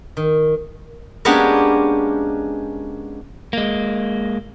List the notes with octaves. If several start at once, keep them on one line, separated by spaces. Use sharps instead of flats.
D#3
G#3 A#3 B3 C#4 D4 G4
G#3 A#3